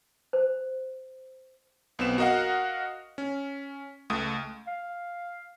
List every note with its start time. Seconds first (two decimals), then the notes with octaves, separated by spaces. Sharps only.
0.33 C5
1.99 B1 B3 C4 E7
2.18 F#4 A#4 D#5 F5 F#5
3.18 C#4
4.10 C#2 A3 D#6
4.67 F5